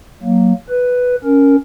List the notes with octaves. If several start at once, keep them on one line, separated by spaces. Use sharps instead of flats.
F#3 A#3
B4
C#4 A#4